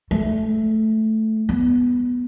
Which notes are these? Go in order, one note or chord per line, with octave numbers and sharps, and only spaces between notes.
A3
B3